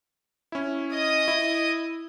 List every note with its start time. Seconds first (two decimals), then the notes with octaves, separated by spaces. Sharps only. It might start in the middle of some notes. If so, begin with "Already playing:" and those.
0.52 C#4 E4
0.93 D#5 D#6
1.28 E4